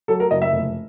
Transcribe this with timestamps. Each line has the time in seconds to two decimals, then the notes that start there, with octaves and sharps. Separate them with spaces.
0.08 F#3 A4
0.20 A#4
0.31 F#1 D#5
0.42 E5
0.53 F1